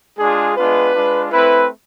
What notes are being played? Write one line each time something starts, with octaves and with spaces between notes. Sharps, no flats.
G#3 D4 F4 G#4
G#3 B3 D4 F4 B4
G#3 D4 F4
A3 C4 E4 B4